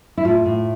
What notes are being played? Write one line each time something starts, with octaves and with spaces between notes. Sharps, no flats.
E4
A2 F4
A2